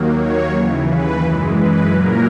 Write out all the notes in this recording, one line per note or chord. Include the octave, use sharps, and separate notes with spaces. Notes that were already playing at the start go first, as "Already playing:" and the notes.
Already playing: D#2 D#3 F#3 A#3
C#5
D#2 C#3 E3
B4
F#2 E3 G#3
B4
A#2 F#3 A#3 A#4